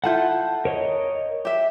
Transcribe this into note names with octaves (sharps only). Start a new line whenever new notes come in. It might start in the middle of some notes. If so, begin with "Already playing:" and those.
E4 F4 A4 F#5 A5 G6
A#4 C#5 D#5
G4 E5